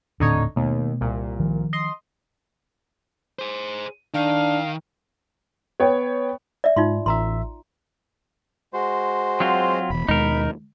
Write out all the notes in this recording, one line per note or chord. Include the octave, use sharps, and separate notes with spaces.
D#1 A2 D3 C4 D#4 C#5
D#2 B2 A3 B3
C2 A#2
D#3 F3
D#5 C6
G#4 C5
D#3 D4 F5
B3 C#5 G5
D5 E5
G#2 D#4 F4 C6
A1 E5 A#5 C6
G#3 F#4 C5
F#3 C4 F4
E1 E2 B5
D#2 B2 G#3 D#4 A#4